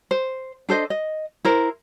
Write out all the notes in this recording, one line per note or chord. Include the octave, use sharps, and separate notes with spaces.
C5
D4 A4 C5 D#5
D#5
E4 A#4 C5